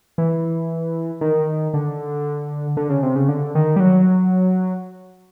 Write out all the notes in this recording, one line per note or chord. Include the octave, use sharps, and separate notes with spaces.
E3
D#3
D3
D3
C#3
C3
C#3
D3
D#3
G3
F#3